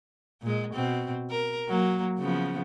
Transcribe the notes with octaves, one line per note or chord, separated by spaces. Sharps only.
A#2 G#3
B2 C4
A#4
F#3 A#3
C#3 F3 B3